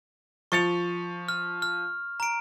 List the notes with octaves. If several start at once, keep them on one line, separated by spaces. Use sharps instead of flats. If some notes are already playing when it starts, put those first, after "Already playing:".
F3 C#6 A6 C#7 F7
F6
F6
A#5 D7